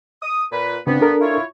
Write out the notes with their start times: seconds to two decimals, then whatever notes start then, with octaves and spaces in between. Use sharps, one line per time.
0.22 D#6
0.52 A#2 B4
0.87 G2 C#3 B3 C4 D4
1.01 D4 A4 A#4
1.21 E4 F4 C#5